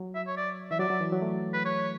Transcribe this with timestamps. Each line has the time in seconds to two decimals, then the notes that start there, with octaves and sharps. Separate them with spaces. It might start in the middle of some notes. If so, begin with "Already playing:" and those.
Already playing: F#3
0.15 E5
0.27 C#5
0.37 D5
0.71 E3 E5
0.79 F#3 D5
0.90 F#3
1.01 E3
1.12 F#3
1.22 A3
1.53 B4
1.65 C#5